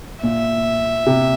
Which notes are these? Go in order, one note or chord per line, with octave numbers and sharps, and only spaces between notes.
A#2 E5
C3